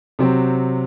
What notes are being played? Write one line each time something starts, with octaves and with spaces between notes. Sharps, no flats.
C3 F#3 C4 F#4